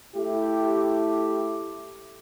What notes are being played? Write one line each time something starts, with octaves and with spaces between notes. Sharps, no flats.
A3 E4 G4